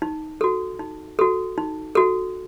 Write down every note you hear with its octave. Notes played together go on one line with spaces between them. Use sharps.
D#4
F#4 A4
D#4
F#4 A4
D#4
F#4 A4